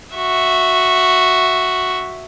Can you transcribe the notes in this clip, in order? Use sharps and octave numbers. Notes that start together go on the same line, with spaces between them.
F#4 E5